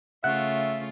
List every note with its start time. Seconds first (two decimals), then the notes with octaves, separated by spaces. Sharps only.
0.24 C#3 A3 F4 E5 F#5